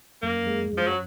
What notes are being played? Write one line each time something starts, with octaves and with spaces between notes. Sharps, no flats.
F#2 A#3
G#3
F#2
F3
F#3